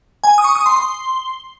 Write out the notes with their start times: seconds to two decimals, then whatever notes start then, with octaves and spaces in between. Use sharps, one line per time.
0.24 G#5
0.38 D#6
0.44 C#6
0.55 D#6
0.66 C6
0.76 C6